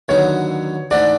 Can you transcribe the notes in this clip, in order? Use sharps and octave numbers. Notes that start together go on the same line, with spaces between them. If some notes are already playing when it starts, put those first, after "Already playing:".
D#2 D3 F#3 B3 D#4 C#5
G#2 E3 A3 D4 F#4 D5